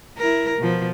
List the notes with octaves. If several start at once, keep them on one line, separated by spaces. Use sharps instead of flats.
E4 A#4
B2 F3